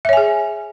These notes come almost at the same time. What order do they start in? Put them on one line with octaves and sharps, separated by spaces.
E5 C#5 G#5 G#4